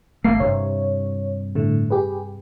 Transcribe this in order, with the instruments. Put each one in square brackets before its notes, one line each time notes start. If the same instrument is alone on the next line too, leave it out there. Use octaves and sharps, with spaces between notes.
[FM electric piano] G1 F5 C7 [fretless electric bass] A3 A#3
[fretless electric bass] G2 C3 [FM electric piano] C#5
[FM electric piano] A2 D3 A3
G4 G#4 B4